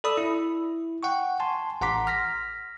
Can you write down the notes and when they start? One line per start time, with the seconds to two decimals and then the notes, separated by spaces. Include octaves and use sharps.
0.04 A4 D5 B5 D#6 E6
0.17 E4
1.03 F#5 G5 C#6
1.40 G#5 A5 C6
1.81 A1 F#5 A#5 C6 D6 B6
2.07 F6 A#6 B6